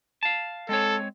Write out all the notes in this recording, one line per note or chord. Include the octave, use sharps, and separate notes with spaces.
F5 A5
G#3 C4 A4 C#5